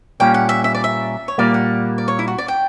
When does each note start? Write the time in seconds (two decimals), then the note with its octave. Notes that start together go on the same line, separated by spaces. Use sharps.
0.20 A#2 G3 A#3 C#4 G5
0.34 F#5
0.49 E5
0.64 E5
0.75 D5
0.84 E5
1.28 C#5
1.38 A#2 G3 A#3 D5
1.54 F#5
1.98 D5
2.08 C#5
2.19 E4
2.28 F#4
2.38 D5
2.48 G5